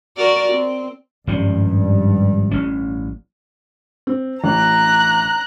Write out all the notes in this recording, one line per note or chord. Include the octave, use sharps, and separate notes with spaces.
F#4 A#4 D5
C4
G#1 G2 F3 C#4
A1 C#4
C4
A1 A#5 F#6